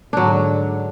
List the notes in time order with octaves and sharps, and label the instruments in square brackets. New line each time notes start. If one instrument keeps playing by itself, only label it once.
[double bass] G#2 D3 [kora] F#3 D4